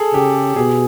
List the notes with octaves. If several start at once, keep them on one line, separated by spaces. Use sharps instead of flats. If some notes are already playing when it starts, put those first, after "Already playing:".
Already playing: G#4 A4
C#3 G4
B2 G#4